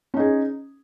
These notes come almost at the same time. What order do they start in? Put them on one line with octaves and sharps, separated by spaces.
C#4 D#4 G#4